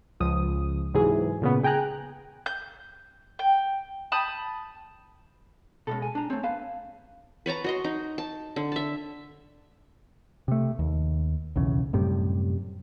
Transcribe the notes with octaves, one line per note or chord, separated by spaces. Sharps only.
C#2 F3 D#6
G#2 C3 E3 F#3 G#4
A#2 C#3 B3
G#4 G5 G#5 A#5 F#6
G6
G5
A5 B5 D#6 G6
B2 G#3 C#4 D4 A4
G#5
D4 A#5
A3 C4 C#5
B3 B4 F5 A5
B4 C#5 A5 A#5
F#4 D#5 C6
D#4
A5
D3
E5 A5
C3 A3
D#2
B1 E2 C#3
F#2 A2 C3 G3